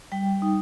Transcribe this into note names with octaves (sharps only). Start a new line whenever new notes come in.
G3 G5
D#4